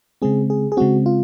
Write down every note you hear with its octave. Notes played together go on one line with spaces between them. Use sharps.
C#3 G#3 C4 G#4
G#4
G#4
C#3 G#3 C4 F#4
F4